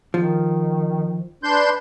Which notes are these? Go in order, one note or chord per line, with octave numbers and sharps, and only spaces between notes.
D#3 F3
D4 B4 C6 G6